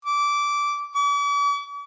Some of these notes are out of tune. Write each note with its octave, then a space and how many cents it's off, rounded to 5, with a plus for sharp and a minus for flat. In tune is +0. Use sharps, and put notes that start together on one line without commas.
D6 -15
D6 -45